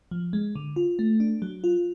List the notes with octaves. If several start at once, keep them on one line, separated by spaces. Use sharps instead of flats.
F3
G#3
D3
F4
A3
D4
F#3
F4